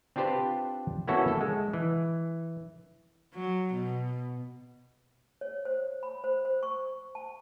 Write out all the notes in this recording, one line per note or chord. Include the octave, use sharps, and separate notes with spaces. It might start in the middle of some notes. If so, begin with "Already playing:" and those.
C4 D4 F4 G4 B4 C5
A#3 B3 C#4 E4 F#4 A4
A4
G#3
E3
F#3
B2
C#5
C5
B5
C5
C5
C#6
A5